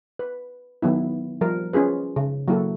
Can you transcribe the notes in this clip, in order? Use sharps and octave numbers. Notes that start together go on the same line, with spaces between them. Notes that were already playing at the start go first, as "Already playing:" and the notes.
B4
D#3 F#3 B3 E4
F3 G3 A#4
C#4 F4 G#4 B4
C#3
F#3 A#3 E4 F#4 A4